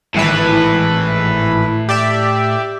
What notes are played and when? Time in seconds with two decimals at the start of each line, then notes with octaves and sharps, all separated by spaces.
0.14 G#1 A2 E3 B4
1.89 G4 D5 E5